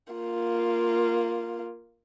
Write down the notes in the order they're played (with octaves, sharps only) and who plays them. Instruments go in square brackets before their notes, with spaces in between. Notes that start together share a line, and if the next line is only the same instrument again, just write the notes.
[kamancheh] A#3 F4